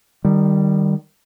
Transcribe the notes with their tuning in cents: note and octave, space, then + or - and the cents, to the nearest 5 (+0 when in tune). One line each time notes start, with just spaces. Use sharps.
D#3 -20 G3 +0